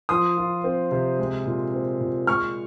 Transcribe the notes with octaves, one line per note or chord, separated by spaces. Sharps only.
F3 C6 D#6
F4
C4
C3
G#3
A#2
C4
A#2
G#3 C#6 F6